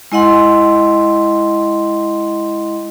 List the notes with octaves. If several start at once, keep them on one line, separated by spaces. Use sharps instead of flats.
G#3 E4 D#5 F#5 C6